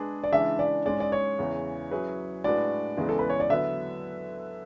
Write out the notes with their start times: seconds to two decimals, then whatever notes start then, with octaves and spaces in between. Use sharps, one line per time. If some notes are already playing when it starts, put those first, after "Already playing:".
Already playing: G#3 D4 G#4 B4
0.24 D5
0.32 C#3 E3 G#3 D4 E5
0.59 D5
0.85 G#2 G#3 C#4 G#4 D5
1.00 D5
1.12 C#5
1.39 E2 C#3 E3
1.91 F#3 C#4 E4 G#4 B4
2.44 A2 G#3 D4 F#4 B4 D5
2.97 E2 C#3 E3 G#3 B3
3.09 A4
3.19 B4
3.29 C#5
3.40 D5
3.50 D3 F#3 B3 E4 B4 E5